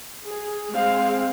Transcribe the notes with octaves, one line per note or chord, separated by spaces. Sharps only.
G#4
G#3 C4 F5